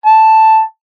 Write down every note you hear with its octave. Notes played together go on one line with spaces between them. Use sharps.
A5